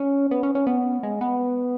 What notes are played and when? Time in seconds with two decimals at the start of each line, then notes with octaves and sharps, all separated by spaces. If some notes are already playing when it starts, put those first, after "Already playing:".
Already playing: C#4
0.31 B3
0.43 C#4
0.55 C#4
0.67 B3
1.03 G#3
1.21 B3